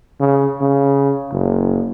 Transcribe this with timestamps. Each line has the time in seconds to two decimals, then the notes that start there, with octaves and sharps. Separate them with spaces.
0.20 C#3
0.61 C#3
1.32 F#1